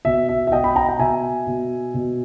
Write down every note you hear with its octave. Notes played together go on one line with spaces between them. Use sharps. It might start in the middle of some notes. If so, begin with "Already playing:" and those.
B2 E5
E5
E5
B2 D#5 G5
B5
G5 A#5
G5
B2 E5 G#5
B2
B2